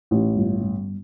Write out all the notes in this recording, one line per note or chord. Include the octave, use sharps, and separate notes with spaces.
A1
G1
G1